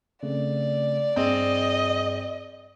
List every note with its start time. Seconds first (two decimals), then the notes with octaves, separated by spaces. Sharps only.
0.23 C#3 A3 C4 D5
1.16 G2 C4 G#4 D#5